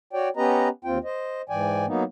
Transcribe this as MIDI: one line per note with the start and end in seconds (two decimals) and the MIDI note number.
0.13 0.29 66
0.13 0.29 73
0.13 0.29 74
0.13 0.29 79
0.37 0.69 59
0.37 0.69 61
0.37 0.69 67
0.37 0.69 71
0.37 0.69 75
0.37 0.69 82
0.85 0.98 39
0.85 0.98 60
0.85 0.98 65
0.85 0.98 79
1.04 1.42 72
1.04 1.42 75
1.49 1.86 44
1.49 1.86 52
1.49 1.86 74
1.49 1.86 79
1.49 1.86 80
1.87 2.04 54
1.87 2.04 58
1.87 2.04 59
1.87 2.04 63